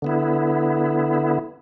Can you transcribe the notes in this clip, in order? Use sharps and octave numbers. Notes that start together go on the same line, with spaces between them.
D3 B3 E4